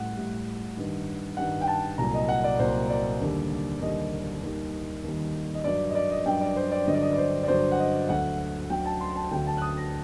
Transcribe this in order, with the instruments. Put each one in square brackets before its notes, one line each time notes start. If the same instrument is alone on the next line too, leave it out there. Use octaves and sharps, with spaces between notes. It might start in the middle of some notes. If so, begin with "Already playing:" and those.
Already playing: [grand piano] A2 G3 F#5
A2 G3
G2 D#3 G3
G2 D#3 G3 F#5
G5
A5
C2 A#2 F#3 A#5
D#5
F#5
D5
C2 A#2 F#3 C5
D5
D#2 D3 G3
D#2 D3 G3 D#5
D#2 D#3 G3
D#2 D#3 G3
D#5
G2 F#3 D5
D#5
D5
D#5
G2 F#3 G5
D5
C5
D5
G2 D3 F#3 D#5
D5
D#5
D5
C5
D5
G2 D3 F#3 C5
F#5
D#5
D2 D3 F#3 F#5
D2 D3 F#3 G5
A5
C6
A5
D2 D3 F#3 G5
A5
F#6
D#6
A#6